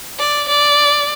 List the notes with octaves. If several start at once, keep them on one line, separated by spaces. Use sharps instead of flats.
D5
D5